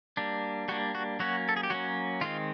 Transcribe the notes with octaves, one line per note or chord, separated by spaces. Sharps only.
G3 A#3 D4
G3 A#3 D4 F#4
F#4
F#3 A#3 C#4 F#4
A4
G#4
G4
F#3 A#3 C#4 F#4
D#3 G#3 C4 F4